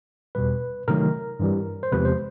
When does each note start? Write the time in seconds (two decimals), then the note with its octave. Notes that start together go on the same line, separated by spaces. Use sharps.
0.35 E2 B2 G3 B4
0.88 C3 D#3 F#3 A3 A#4
1.40 G2 E3 G3
1.83 C5
1.92 E2 C3 F3 G#3 B4
2.05 C5